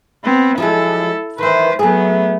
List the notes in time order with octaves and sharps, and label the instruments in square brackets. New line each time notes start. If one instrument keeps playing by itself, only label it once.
[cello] B3 C4
[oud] F3 F#3 G#3 [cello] E4 A4
[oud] D#3 E3 [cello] B4 C5
[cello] F#3 B3 [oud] A3 G#4